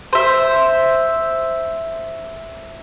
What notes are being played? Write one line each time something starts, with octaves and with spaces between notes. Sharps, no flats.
C5 E5